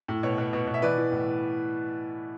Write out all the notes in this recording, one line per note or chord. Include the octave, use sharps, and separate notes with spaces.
A2
B2 C#5
B2
B2
B2
E5
E3 B4 D5
E3
A2